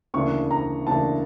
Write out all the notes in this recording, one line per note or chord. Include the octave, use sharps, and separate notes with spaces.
D2 C#3 E3 A#3 D4 C#6
A#5
D2 C#3 E3 A#3 D4 A5